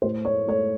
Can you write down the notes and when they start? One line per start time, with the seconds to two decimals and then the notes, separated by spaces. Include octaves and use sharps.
0.02 A2 C5
0.25 A3 C#5
0.47 A3 C#5